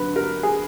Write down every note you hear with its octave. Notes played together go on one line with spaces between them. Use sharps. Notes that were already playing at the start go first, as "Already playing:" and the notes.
Already playing: D3 F#3 B4
A#4
G#4